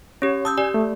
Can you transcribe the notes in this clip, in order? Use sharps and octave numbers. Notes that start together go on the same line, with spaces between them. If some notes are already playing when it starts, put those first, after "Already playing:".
C#4 G4 C#5
A5 D#6 E6 G6
G4 D5 G#5
A3